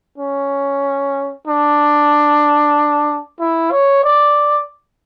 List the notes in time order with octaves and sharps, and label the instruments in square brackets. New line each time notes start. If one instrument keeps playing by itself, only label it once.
[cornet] C#4
D4
E4
C#5
D5